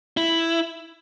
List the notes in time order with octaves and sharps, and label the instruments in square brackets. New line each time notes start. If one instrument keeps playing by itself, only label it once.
[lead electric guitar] E4